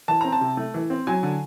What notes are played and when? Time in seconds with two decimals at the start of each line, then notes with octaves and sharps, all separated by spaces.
0.08 E3 A5
0.21 C4 A#5
0.32 A5
0.41 C3
0.57 A3
0.74 E3
0.90 C4
1.07 F#3 G#5
1.23 D3